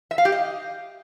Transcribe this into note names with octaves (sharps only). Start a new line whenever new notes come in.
E5
F5
G4
D#5